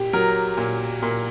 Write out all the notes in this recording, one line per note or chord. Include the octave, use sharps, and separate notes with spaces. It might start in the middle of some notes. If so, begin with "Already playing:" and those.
Already playing: A#2 G4
F#3 A#4
A#2
A#2